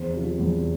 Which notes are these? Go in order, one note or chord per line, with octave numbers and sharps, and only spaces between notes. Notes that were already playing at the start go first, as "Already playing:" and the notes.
Already playing: E2 C5
C3 F3
E2